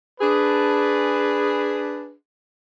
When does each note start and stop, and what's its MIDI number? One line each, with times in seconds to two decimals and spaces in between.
0.21 2.12 62
0.21 2.12 68
0.21 2.12 71